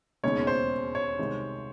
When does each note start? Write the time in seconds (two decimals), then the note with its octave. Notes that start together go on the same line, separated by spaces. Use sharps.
0.23 E1 D#2 C#3 G#3 C#5
0.47 C5
0.95 C#5
1.18 C2 C3 D#3 G#3